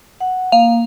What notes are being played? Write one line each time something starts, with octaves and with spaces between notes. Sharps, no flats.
F#5
A#3 F5